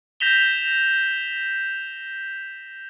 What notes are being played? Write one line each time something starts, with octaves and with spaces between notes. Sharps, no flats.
G6 A#6 B6 E7 F7 G7